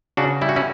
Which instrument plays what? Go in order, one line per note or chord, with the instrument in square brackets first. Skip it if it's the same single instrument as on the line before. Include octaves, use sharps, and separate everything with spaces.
[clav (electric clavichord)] C#3 D4 F#4
G3 E4
F#4
C#4 E4